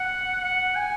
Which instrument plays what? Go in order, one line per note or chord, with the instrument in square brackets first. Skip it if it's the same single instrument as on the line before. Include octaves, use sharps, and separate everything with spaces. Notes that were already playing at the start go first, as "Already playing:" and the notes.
Already playing: [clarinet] F#5
F#5
G#5